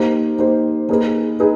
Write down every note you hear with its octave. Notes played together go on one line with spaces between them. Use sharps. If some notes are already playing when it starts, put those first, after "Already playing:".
Already playing: A#3 D#4 G4 C5
A#3 D#4 G4 C5
A#3 D#4 G#4 B4
D#4 G#4 B4